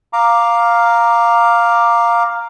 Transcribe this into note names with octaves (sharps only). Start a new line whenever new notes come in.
F5 A#5 D6